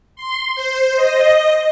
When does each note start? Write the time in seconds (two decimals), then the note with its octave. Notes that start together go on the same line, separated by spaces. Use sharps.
0.16 C6
0.55 C5
0.96 D#5